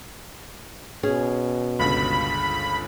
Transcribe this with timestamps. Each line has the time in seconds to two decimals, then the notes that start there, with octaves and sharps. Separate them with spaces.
1.03 B2 C#4 G#4
1.79 G1 C#2 G2 B5